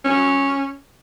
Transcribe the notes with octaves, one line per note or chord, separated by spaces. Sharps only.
C#4